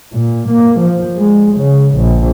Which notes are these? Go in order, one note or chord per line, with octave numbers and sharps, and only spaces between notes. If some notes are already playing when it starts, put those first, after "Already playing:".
A#2
A#3
F3
G#3
C#3
A#1